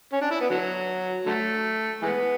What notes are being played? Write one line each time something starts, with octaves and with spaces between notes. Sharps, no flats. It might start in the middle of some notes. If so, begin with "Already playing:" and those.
C#4
D4
E4
B3
D3 F#3
D3 F#3 A3
E3 G#3 B3